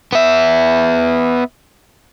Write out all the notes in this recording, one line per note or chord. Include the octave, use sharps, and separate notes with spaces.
B3 E5